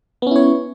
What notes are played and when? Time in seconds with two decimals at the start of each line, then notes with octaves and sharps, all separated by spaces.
0.22 B3
0.27 C#4
0.31 E4
0.36 C#5